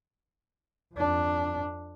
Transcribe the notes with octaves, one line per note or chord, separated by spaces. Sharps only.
F2 D4